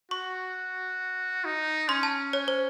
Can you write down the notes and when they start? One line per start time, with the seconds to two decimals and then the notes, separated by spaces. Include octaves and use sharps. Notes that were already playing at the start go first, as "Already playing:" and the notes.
0.11 F#4 C#6
1.45 D#4
1.88 C#4 C6
2.03 A5
2.33 C#5
2.48 C5